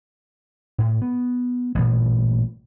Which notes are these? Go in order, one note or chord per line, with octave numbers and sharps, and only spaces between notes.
A2
B3
A1 G2 A#2